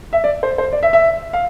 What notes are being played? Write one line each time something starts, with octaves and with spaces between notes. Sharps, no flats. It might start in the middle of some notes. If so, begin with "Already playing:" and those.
E5
D5
C5
C5
D5
E5
E5
F5